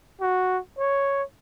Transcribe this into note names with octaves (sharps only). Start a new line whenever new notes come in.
F#4
C#5